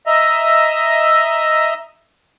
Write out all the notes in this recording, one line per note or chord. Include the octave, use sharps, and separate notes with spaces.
D#5 E5 A#5 E6